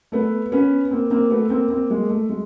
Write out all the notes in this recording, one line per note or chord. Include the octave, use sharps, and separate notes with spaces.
A3 B3
B3 C#4
A#3 C4
A#3 C4
A3 B3
A#3 C4
A#3 C4
G#3 A#3
A3
G#3